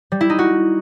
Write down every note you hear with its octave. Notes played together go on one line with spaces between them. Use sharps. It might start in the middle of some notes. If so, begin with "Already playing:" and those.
G3
E4
D#4
F#4